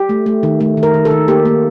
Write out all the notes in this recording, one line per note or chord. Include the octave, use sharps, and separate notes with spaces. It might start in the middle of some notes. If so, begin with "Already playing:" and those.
Already playing: G4
A3
A3
D#3
A3
D#3
A#4
D#3
A4
D#3
A#3 G4
A#3